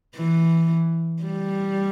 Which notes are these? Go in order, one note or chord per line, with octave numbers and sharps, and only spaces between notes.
E3
G3